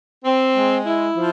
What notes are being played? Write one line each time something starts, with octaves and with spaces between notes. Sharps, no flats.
C4
G#3
E4
F3